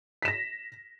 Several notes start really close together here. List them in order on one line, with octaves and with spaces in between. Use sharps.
B6 E7 A#6